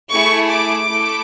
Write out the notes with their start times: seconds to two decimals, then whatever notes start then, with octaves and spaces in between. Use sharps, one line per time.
0.13 A3 E4 G#4 C#6
0.51 D6
0.89 A3 E4 A4